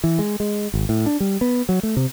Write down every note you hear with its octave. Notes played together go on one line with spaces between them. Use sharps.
E3
G#3
G#3
G#1
A2
D4
G3
B3
F#3
A3
C3